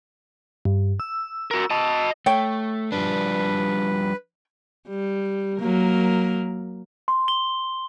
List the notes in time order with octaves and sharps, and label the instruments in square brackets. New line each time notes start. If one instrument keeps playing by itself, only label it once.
[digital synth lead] G2
E6
[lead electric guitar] F#4 A#4
D#5 A5
[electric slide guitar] A3 [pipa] C#5 G5
[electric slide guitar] F3 G3 D4 [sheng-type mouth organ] B4
[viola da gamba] G3
F#3 A#3 A#4
[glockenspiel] C6
G7